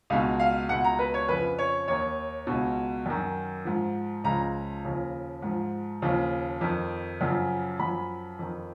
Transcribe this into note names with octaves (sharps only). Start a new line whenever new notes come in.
C#2 B2 F5
F5
C#2 B2 F#5
A#5
B4
C#5
F2 C#3 F3 B4
C#5
D#2 D#3 C#5
C#2 B2
F#2 D#3
G#2 F3
C#2 C#3 F3 A#5
D#2 C#3 F3
G#2 F3
D#2 C#3 F3
F2 D#3
F#2 C#3 F3
F#2 F3 B5
F2 D#3